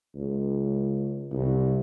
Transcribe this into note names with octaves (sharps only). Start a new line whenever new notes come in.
C#2
C2